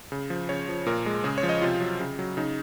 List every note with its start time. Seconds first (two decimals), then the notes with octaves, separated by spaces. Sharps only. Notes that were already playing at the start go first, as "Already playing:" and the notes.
0.12 C#3
0.30 F3
0.49 C#3 C#5
0.69 F3
0.86 A#2 A#4
1.06 G#3
1.24 C#3 G#4
1.38 C#5
1.43 F3
1.49 D#5
1.62 C3 F4
1.81 F#3
2.00 C#3
2.19 F#3
2.37 C#3 D#4